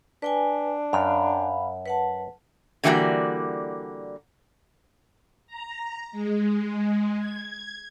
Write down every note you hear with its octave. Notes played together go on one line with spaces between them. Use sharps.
D4 B4 G5 G#5
F#2 F5 B5
B4 F#5 A5
D3 E3 G3 A#3 F#4 D5
A#5
G#3
G#6